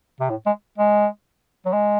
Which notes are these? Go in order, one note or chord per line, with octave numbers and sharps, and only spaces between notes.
C3
A2
G#3
G#3
F#3
G#3